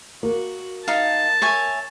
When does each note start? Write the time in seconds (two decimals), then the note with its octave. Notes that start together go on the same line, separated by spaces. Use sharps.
0.23 A#3 F#4
0.88 D#4 F5 A5
1.42 C#5 E5 G#5